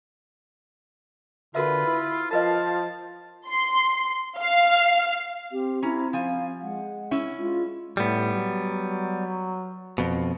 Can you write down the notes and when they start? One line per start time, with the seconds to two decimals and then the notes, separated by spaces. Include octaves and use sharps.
1.55 D3 F4 F#4 A#4 B4 E5
1.86 E4
2.31 F3 F4 A#4 B4 D#5 A5
3.48 C6
4.39 F5
5.52 C4 G4
5.82 C#4 E4 A#5
6.13 F3 F5 G#5
6.62 G#3 F#5
7.11 C#4 E4
7.38 G#3 F4
7.97 A2 G3 B3
8.35 F#3
9.98 F2 B2